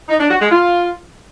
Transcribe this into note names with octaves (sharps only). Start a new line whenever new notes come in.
D#4
D4
F#4
G#3
F4